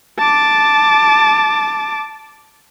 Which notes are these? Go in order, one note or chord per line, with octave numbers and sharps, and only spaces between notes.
A5 D6